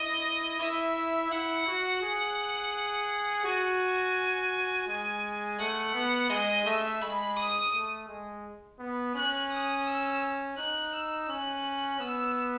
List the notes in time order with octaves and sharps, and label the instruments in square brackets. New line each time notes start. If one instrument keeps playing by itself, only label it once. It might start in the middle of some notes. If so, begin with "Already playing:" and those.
Already playing: [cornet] E4 [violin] D#5
[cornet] E4 [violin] E5
[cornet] E4 [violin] F#5
[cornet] F#4
G#4
[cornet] F#4 [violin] G#5
[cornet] G#3
[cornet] A3 [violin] F#5
[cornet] B3
[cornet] G#3 [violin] D#5
[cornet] A3 [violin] E5
[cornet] G#3 [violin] B5
[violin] D#6
[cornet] A3
G#3
B3
[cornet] C#4 [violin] F#6
[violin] D#6
E6
[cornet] D#4 [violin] F#6
[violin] E6
[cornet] C#4 [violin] F#6
[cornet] B3 [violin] E6